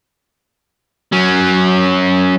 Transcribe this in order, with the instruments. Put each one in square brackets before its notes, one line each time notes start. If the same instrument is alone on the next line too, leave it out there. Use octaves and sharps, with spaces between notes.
[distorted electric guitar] F#3 C#4